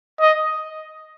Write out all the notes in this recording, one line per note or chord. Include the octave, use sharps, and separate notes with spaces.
D#5